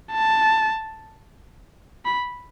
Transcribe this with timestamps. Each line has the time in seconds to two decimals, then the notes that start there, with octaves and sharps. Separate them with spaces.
0.12 A5
2.05 B5